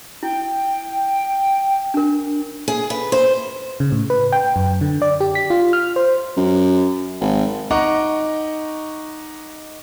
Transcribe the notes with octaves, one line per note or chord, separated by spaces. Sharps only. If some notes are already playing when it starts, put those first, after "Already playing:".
E4 G5
D4 A#4
G#4
B4
C5
C#3
A2
B4
G5
F#2
D3
D5
G4
B6
F4
F6
C5
F#2
G#1
D#4 F#5 A#5 C#6 D6